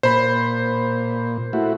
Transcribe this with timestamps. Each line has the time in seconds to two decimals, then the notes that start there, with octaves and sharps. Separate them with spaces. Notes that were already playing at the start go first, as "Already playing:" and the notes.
0.03 A#2 C5 B5
1.53 A3 E4 F#4